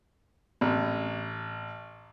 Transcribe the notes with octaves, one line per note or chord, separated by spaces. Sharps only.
A1